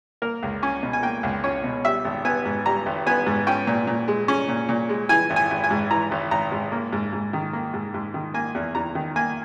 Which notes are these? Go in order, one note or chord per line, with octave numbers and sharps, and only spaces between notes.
A#3 A#4
C#2
C#4 G#5
B2
G#5
A#3 G5
C#2
C#4 C#5
B2
G3 E5
G#1
B3 G#5
G#2
G3 A#5
G#1
B3 G#5
G#2
C#4 G5
A#2
A#2
G#3
C#4
A#2
A#2
G#3
E3 G#5
G#1
G#5
G#1
G#5
G#2
E3 A#5
G#1
G#1 A#5
G#2
A#3
G#2
G#2
D#3
A#3
G#2
G#2
D#3
A#3 G#5
E2
E2 A#5
D#3
A#3 G#5